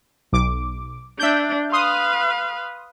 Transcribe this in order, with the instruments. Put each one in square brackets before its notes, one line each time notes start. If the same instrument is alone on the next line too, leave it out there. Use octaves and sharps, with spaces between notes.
[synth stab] B1 D6
[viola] D4 [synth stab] E5 G6
[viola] B4 F5 [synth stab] C6 D#6